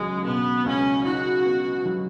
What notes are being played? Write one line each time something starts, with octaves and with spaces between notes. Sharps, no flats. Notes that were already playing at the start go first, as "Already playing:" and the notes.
Already playing: C#2 F#3 G#3
B2 B3
C#2 C#4
D#4 F#4
B3
F#3